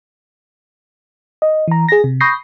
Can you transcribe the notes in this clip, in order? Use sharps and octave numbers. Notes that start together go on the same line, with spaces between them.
D#5
E3 A#5
G#4 A#6
C3
B5 C#6 D#6 G6 A#6 C7